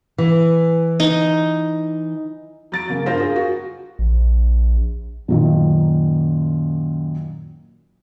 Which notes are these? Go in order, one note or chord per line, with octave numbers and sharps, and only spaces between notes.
E3
D#4
F#3 A6 D7
C#3 A#3
G2 F4 A#4 C5 A#6
F4 G#4 A#4
F#4
A#1
F#2 A#2 D#3